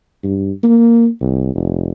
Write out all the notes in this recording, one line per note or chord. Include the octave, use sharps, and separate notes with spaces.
G2
A#3
C2
F1